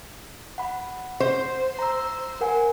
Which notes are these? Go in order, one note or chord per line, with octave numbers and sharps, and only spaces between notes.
F#5 B5
C5
A#5 E6
A#4 F#5 G#5